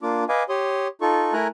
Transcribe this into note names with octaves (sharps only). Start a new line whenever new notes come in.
A#3 D4 F4 D6
B4 D#5 F5 G#5 D6
G4 C#5 C6 D#6
D#4 F4 A4 C#6
A3 E4 A#4 G#5 A#5 F#6